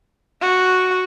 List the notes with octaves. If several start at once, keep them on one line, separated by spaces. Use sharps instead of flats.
F#4